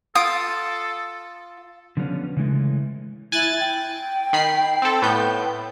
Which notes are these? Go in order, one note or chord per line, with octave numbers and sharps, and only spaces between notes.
F4 A4 D#6 D7
D3 F3 G3 B3 C#4
C#3 E3 G#3 A3
E4 G#5 F#6 A6
G5
D#3 B5 C7
C4 A4
A2 B3 G6